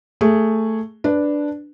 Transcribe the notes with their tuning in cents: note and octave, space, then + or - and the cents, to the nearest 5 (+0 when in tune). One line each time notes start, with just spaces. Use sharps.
A3 +10 G#4 +0
D4 +0 B4 +0